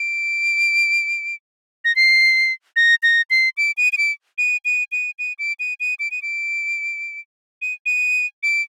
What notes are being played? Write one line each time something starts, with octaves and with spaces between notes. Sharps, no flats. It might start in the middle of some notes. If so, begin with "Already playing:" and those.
Already playing: D7
A#6
C7
A#6
A#6
C7
D7
D#7
D#7
D7
D#7
D#7
D#7
D#7
D7
D#7
D#7
D7
D#7
D7
D#7
D#7
D7